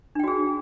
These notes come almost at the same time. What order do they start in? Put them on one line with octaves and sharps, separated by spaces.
D4 G5 F#4 G#4